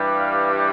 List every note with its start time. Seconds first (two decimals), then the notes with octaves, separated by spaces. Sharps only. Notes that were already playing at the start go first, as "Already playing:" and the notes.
Already playing: G2 E3 G3
0.17 F5